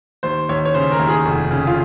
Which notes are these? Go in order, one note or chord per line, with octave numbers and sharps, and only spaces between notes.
D#2 C5
D#2 C#5
C#5
C#3 C5
A#4
D#2
G#4
F1
C#3
F4